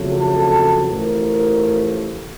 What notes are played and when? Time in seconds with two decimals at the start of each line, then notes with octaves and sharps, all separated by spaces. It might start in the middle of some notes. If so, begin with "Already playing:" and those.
Already playing: F2 C#3 F#3 A3
0.20 A4 A5
0.89 A1 A2 F3 A3 A#4